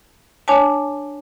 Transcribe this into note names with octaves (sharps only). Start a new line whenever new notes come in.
D4 C#5 G#5 A5